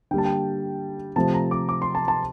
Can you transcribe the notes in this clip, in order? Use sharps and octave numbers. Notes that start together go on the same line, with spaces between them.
D3 G3 A#3 G5 A5
G5
C3 F3 A3 A5
A#5
D6
D6
C6
A5
A5